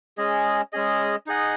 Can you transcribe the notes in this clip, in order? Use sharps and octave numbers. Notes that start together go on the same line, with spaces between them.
G#3 C#4 G#4 D#5
G#3 C#4 G#4 D#5
D#4 G#4 D#5 F#5